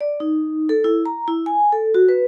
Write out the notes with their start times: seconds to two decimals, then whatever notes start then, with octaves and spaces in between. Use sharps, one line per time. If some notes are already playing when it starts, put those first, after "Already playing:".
0.01 D5
0.20 D#4
0.69 A4
0.84 E4
1.06 A#5
1.28 E4
1.46 G#5
1.72 A4
1.94 F#4
2.09 B4